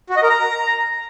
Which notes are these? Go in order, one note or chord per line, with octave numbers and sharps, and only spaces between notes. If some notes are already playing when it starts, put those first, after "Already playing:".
F#4
D#5
A#4
A#5